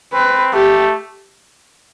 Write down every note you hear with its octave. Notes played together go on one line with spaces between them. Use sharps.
C4 B4
A3 G4